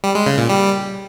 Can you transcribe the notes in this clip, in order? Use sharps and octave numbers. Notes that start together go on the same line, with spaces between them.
G3
G#3
C#3
A#2
G3